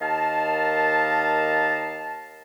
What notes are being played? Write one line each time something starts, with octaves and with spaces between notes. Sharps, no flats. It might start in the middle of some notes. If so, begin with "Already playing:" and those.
D#2 A#4 D#5 F5 A5